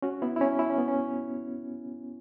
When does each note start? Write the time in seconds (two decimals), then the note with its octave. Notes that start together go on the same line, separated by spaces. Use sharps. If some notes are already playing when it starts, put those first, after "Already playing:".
0.02 C#4 F#4
0.22 B3 E4
0.36 E4
0.41 C#4
0.59 E4
0.70 C#4
0.78 B3
0.88 C#4